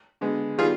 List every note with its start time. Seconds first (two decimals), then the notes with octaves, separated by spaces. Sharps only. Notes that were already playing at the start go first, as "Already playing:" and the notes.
0.21 D3 G#3 B3
0.58 D#3 G3 B3 F4 G#4